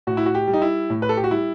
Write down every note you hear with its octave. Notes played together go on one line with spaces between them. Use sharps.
A2 F#4
E4
F#4
G4
G3
D#4
E4
A2
B4
A4
G4
F#4
G3 E4